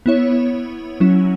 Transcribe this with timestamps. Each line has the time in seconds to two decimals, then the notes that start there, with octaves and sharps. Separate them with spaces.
0.06 B3 E4 C#5
1.00 F#3 C#4 E4